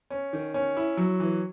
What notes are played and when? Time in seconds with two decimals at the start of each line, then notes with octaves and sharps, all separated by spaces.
0.10 C#4
0.33 D#3
0.54 C#4
0.77 E4
0.97 F#3
1.20 E3